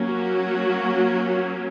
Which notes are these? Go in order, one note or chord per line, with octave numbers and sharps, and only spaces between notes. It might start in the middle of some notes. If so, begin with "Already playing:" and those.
Already playing: F#3 A#3 C#4
F#4